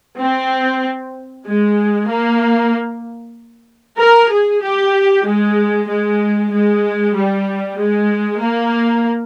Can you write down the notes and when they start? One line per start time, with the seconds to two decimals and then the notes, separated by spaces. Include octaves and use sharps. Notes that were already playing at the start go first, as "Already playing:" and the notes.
0.20 C4
1.46 G#3
2.09 A#3
3.99 A#4
4.31 G#4
4.62 G4
5.26 G#3
5.88 G#3
6.51 G#3
7.15 G3
7.78 G#3
8.41 A#3